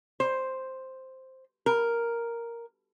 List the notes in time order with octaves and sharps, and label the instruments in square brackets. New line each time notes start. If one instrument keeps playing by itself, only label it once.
[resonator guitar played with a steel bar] C5
A#4